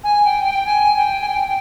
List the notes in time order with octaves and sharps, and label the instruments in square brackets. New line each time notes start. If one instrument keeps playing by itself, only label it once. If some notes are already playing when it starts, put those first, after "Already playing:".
[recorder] G#5
G5
G5
G#5
G5
G#5
G5